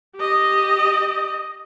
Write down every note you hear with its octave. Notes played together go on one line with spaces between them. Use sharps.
G4 D#5